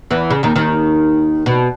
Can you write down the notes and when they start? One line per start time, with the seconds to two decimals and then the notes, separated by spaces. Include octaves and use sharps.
0.10 E2 E3
0.30 C#3
0.43 D#2 D#3
0.56 D#2 D#3
1.46 B2